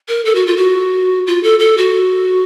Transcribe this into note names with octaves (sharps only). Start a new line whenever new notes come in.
A#4
A4
F#4
F4
F#4
F4
A4
A4
F#4